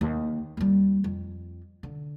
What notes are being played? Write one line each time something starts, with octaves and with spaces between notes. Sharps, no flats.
D#2
D#2 G3
F2
D3